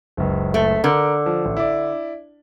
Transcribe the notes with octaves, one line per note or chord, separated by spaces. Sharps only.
F#1 C#2
A3
D3 A#4
F3
A1
E4 D5